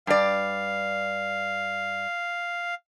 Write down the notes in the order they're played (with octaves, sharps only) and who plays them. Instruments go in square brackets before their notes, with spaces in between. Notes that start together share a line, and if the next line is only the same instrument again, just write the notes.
[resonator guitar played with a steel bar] G2 D5 [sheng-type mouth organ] F5